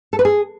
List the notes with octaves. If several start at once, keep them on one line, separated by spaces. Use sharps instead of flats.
A4
B4
G#4